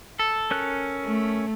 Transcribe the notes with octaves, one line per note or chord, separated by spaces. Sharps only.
A4
C#4 A#4 F#6
A3